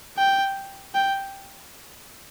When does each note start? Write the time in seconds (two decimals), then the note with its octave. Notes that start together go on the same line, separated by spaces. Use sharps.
0.18 G5
0.95 G5